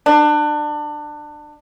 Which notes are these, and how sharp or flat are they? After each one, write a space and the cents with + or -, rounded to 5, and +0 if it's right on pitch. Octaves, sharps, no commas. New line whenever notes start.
D4 +25